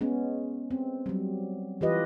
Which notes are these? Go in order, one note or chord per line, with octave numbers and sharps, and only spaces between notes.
G#3 B3 C#4
C4
F#3 G3
E3 F4 G4 B4 D#5